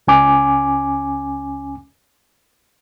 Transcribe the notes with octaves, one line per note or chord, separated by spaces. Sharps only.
C#2 C#4 G#5 D6